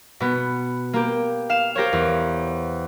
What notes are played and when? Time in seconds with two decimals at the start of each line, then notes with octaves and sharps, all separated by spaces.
0.20 B2 B3
0.93 A#3 G4
1.50 F5 E7
1.75 G4 A#4 C5 C#5
1.93 E2